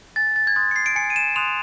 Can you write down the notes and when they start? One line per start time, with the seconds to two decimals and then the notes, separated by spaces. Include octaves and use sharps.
0.16 G#5 A6
0.36 A6
0.47 G#6
0.56 C6 D#6 F#6 A6
0.71 C#7
0.76 C7
0.86 D7
0.96 G#5 C#7
1.10 D#7
1.16 E7
1.36 C6 D#6 F#6 F7